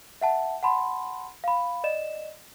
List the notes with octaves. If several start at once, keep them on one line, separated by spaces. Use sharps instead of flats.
E5 F#5 A5
F#5 A5 B5 C6
F5 B5
D5 D#5 E7